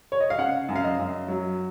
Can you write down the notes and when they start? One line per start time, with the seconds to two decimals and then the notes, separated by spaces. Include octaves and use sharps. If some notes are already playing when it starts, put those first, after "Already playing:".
0.12 C#5
0.20 D#5
0.30 F5
0.39 C#3 F#5
0.69 F#2
0.76 F5
0.84 D#5
0.99 F#2
1.28 F#3